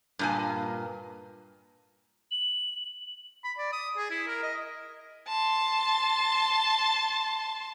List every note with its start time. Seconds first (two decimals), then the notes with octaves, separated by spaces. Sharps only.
0.19 G2 A#2 G#5
2.31 F#7
3.44 B5
3.58 D5
3.73 D#6
3.97 G#4
4.10 E4
4.27 A#4
4.43 D#5
5.28 A5 C6